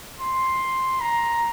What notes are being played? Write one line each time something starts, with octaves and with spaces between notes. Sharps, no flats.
C6
A#5